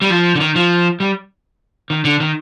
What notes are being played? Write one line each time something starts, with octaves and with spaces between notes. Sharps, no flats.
G3
F3
D3
D#3
F3
G3
D#3
D3
D#3